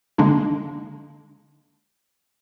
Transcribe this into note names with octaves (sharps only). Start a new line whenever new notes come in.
D3 G#3 A#3 D4 D#4